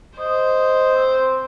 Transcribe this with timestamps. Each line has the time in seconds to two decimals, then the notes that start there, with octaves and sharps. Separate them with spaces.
0.18 C5 D#5
0.95 C4